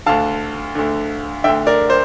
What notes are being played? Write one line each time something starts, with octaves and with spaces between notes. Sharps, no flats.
D2 D3 F5 A5
D2 D3
D2 D3 E5 G5
A#4 D5
C5